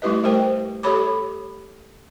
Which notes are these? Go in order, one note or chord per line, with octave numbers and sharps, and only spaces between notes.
G3 A3 E4 G4 B4 D#5
A3 G4 A#4 C5 G5
G4 A4 C#5 B5 D6